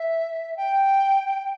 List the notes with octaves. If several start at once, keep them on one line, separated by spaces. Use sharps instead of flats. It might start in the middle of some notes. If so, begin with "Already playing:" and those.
Already playing: E5
G5